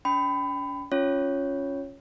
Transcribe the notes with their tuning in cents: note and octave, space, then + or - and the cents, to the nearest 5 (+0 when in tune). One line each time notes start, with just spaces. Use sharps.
C#4 +45 G5 +0 B5 +25
C#4 +0 F4 +0 C#5 +0